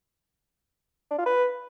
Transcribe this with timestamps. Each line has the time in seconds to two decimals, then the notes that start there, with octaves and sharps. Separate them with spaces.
1.11 D4
1.18 F4
1.26 B4